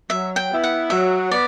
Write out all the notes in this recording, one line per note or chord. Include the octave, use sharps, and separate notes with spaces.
F#3 E5
G5
B3 E4
F#5
F#3 E5
B3 D5